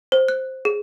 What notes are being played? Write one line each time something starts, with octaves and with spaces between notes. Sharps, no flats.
C5
F#6
G#4